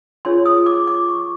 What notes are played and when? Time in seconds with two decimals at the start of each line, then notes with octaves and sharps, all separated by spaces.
0.25 D4 F4 G#4 C#5 C6
0.46 D#6
0.66 D6
0.87 D6
1.08 C#6